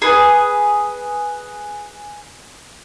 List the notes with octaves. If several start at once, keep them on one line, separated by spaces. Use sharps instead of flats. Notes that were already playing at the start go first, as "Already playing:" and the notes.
G#4 B4